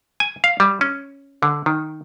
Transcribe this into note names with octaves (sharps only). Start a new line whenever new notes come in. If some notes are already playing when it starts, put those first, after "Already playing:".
G#5
F5
G3
C#4
D3
D#3